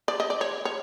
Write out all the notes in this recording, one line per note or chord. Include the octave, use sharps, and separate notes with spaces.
D5
D#5
D5
C#5
C#5